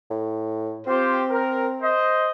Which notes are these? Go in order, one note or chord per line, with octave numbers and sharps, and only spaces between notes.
A2
C4 F4 G4 C5
A#4
C5 D#5